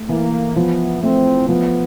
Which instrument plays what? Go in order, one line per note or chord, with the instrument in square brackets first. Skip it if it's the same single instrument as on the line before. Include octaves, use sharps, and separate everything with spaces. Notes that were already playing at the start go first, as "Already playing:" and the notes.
Already playing: [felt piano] A3
[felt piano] E3 [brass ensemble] A#3
[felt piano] F3 [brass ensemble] B3
[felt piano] A3 [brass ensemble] C4
[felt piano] F3 [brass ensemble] B3